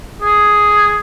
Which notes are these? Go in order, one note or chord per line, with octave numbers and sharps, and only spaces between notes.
G#4